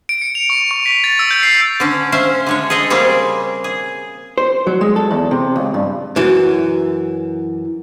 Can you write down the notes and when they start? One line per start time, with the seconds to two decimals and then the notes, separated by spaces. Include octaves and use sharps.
0.09 D7
0.22 C#7
0.35 F7
0.50 C#6
0.71 C#6
0.86 B6
1.04 A6
1.19 E6
1.31 G6
1.43 C7
1.80 D3 C#4
2.12 C#4 C5 E5 F5
2.46 D3 G#3 C#5
2.70 G#4 A4 C#5 D#5 G5
2.90 C#3 G3 A#3 C4 G4 G#4
3.64 G#4
4.38 C5
4.67 F#3
4.81 G#3
4.96 A4
5.11 E2
5.31 C3
5.56 C#2
5.74 G2
6.16 F#2 E3